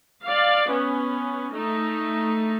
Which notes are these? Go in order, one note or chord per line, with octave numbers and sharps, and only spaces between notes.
D5 F5
B3 C#4
A3 D#4